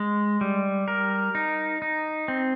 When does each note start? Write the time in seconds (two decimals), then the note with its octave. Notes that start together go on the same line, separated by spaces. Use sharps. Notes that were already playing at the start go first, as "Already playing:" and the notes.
Already playing: G#3
0.41 G3
0.88 A#4
1.35 D#4
1.82 D#4
2.28 C4